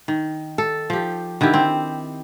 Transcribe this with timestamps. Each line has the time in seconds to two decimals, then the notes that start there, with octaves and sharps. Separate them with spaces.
0.08 D#3
0.58 A4
0.90 F3 G4
1.41 D3 D#3 E4 G4
1.54 C4